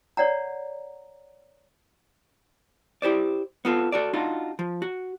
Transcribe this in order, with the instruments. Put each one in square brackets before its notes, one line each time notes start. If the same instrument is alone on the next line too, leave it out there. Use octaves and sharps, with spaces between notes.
[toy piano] C#5 D5 F#5 A#5
[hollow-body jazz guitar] E4 G4 C5 D5
B3 F4 A4
F#4 A4 D5
D4 D#4 F4 F#4
F3
F#4